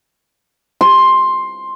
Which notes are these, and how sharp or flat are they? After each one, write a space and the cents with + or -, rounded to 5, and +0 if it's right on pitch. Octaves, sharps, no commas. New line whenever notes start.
C6 +10